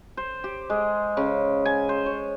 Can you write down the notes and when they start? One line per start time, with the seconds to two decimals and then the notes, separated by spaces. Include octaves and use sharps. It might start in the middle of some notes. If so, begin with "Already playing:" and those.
0.17 C5
0.44 G4
0.70 G#3
1.17 C#3
1.65 G#5
1.89 C5
2.06 C#5